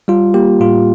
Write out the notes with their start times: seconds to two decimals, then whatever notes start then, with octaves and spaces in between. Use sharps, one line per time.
0.08 G3 F4
0.34 A#3 G4
0.60 A2 F4